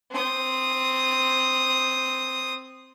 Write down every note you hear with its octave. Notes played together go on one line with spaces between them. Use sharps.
C4 D#6